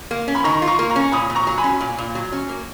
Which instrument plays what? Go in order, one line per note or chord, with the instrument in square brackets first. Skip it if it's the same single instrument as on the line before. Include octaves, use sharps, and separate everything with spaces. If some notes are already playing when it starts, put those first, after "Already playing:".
[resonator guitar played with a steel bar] A#3
C#4
[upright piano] B5
[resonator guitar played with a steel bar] D#3 [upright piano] A#5 C#6
[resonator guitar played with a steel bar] F4
[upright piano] A#5 C#6
[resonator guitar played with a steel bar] A#3
[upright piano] A#5 C#6
[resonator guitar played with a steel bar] C#4
[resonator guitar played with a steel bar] A#2 [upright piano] B5 D#6
[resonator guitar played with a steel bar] A#2
[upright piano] A#5 C#6
[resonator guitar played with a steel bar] F#3
[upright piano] G#5 B5
[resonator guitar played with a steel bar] C#4
A#2
A#2
F#3
C#4
A#3